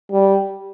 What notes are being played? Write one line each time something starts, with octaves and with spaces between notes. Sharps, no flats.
G3